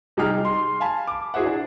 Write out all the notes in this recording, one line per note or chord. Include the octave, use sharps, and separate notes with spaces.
C3 G3 D#4 G#4 G5 F6
C6
F5 G#5 A5 B5
D6
E4 F#4 G#4 C5 E5 F#5
D4 F#5